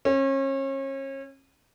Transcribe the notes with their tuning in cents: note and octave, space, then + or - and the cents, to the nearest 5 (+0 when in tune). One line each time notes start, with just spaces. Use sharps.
C#4 -35